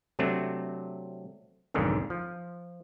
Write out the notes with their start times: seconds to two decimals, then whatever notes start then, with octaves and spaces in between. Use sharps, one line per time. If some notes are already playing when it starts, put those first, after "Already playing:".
0.19 C3 F#3 A3 C4 D4
1.74 B1 F2 G#2 D3 D#3
2.10 F3